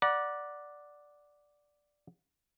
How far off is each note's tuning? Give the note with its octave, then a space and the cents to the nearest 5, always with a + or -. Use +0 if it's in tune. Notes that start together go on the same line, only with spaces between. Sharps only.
D5 +0 F#5 +0 A#5 +45